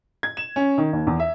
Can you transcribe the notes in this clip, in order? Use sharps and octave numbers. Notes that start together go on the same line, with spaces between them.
G#6
E7
C#4
D#3
D#2
E2
E5